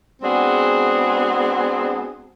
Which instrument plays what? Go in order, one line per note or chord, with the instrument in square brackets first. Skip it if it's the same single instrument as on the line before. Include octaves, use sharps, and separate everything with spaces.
[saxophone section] G#3 B3 C4 D4 F#4 G#4